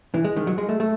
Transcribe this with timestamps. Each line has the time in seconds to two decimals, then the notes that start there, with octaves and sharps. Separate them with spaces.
0.14 E3
0.25 G#3
0.36 D#3
0.47 F#3
0.58 G#3
0.69 A3
0.80 A3